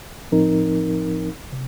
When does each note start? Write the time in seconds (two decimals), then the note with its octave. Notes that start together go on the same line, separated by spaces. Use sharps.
0.32 A2 F3 C4 D#4 A#4
1.52 C3